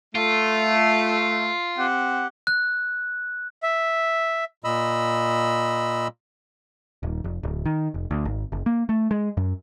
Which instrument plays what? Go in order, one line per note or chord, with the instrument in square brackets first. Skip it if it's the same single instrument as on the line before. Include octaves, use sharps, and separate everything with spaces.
[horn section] A3 [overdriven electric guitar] F4
[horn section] C4 G4 F#5
[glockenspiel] F#6
[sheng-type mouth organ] E5
[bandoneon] A#2 D#5 B5 E6
[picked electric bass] D#1
F1
D1
D#3
F1
D2
G#1
F#1
A#3
A3
G#3
F#2